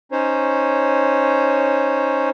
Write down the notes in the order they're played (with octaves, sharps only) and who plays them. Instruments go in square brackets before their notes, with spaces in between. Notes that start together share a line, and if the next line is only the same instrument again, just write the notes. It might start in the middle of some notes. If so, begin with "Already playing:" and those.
[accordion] C#4 D#4 C5 C#5